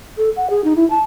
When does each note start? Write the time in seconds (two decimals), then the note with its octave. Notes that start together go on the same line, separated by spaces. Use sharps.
0.17 A4
0.36 F#5
0.50 G#4
0.64 D#4
0.76 E4
0.90 A5